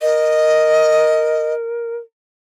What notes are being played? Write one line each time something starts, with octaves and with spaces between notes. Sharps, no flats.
A#4 D#5